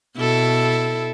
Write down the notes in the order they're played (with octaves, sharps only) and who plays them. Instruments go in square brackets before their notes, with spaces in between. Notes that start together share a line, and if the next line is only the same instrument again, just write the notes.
[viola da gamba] B2 E4 A4